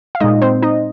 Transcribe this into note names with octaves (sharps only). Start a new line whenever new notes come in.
F5
A#2 G#3 D#4 D#5
C4 C5
D#4 D#5